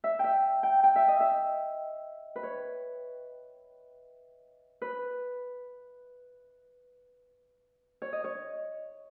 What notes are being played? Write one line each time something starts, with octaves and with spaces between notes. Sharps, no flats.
E5
E5 G5
G5
G5
E5
D#5
E5
B4
C#5
B4
C#5
D#5
C#5